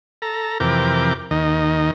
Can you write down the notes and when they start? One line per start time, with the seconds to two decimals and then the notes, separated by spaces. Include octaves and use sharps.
0.22 A4 A#5
0.60 F2 C3 E3 A#4 G5 D6
1.31 D#2 D#3 D#5